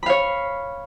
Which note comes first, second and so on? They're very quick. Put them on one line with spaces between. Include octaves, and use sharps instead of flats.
B5 F5 C#5